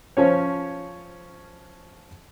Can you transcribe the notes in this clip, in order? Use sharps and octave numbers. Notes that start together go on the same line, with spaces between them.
F3 C#4 C#5